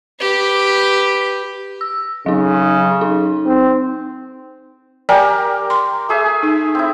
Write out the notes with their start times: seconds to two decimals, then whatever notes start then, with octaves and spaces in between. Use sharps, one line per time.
0.21 G4 B4
1.81 E6
2.26 C#3 F#3 D#4
3.01 D#4
3.46 C4
5.09 G4 A#4 D5 G5 G#5
5.70 C6
6.09 A3 G#4 E5
6.43 D#4
6.75 C4 E4